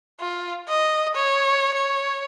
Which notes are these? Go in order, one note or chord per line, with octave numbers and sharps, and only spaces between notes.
F4
D#5
C#5
C#5